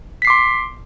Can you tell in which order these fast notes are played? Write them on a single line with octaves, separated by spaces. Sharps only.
B6 C7 D6 C6